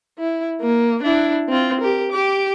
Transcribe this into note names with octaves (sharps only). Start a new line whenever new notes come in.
E4
A#3
D4 E4
C4 F4
G4 A#4
G4 D6